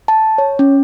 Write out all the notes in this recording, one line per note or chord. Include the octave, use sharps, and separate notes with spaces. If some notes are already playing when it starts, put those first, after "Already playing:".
A5
C#5
C#4